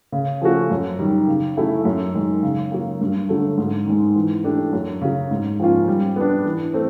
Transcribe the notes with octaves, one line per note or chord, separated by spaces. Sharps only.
C#3
F3 A3 C#4 F#4
F#2
D#3 G3
C#3
F#3 A3 C#4 E4
F#2
D#3 G#3
C#3
F#3 A#3
G2
D3 F#3 A3
G#2
D#3 G#3
E3
A3 D4 G4
F#2
C#3 F#3
G#2
F3 A#3 C#4 F4
G3
B3 D4
E3
A3 C4